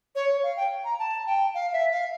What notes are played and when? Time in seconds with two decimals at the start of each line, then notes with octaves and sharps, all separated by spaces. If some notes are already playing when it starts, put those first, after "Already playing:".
0.15 C#5
0.43 F5
0.57 G5
0.85 A#5
0.99 A5
1.27 G5
1.54 F5
1.73 E5
1.92 F5